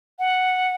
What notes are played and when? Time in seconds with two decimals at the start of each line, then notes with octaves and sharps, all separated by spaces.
0.19 F#5